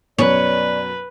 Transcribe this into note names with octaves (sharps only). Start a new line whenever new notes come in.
F#2 B2 B4 C#5 D5